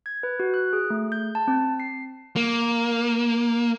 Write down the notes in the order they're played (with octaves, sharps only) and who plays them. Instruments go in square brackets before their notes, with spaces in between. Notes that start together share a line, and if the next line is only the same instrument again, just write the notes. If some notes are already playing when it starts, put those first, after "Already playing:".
[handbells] G#6
B4
F#4
F#6
G#4
A3
G6
A5
C4
C7
[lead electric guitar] A#3